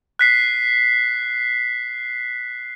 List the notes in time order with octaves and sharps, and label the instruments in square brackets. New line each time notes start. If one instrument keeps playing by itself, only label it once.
[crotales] F#6 B6 C7